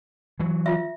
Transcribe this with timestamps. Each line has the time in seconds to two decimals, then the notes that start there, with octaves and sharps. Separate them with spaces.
0.40 E3 F#3
0.66 F4 E5